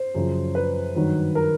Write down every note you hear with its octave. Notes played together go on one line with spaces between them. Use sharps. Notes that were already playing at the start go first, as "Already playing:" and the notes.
Already playing: C5
F#2 C#3 F3
B4
G2 D#3 F#3
A#4